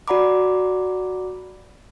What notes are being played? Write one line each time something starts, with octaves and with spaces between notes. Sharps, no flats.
F#4 D5 F#5 A#5 B5 D6